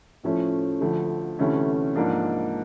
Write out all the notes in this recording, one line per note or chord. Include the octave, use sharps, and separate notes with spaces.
A2 F3 A3 C#4
D2 D3 F3 A3
D2 C3 E3 A3 C#4
G#2 F3 A#3 D4